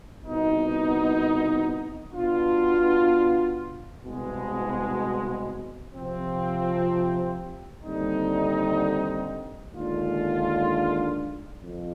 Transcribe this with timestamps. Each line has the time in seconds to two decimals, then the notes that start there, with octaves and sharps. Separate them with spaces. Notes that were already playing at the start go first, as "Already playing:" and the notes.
0.24 C2 B2 B3 D#4
2.13 B2 B3 D4 F4
4.04 C2 B2 G#3
5.93 C3 F3 C4
7.83 D#2 D3 G3 C4 D#4
9.73 D#2 D3 G#3 D4 F4
11.63 F2